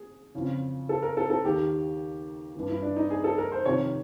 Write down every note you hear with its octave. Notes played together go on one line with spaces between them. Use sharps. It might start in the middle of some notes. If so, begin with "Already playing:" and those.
Already playing: G#4
F2 C#3 E3
A4
A#4
A4
A4
D#2 D#3 G4
G2 E3
E4
D4
D#4
G#4
A4
A#4
C5
F2 C3 D#3 C#5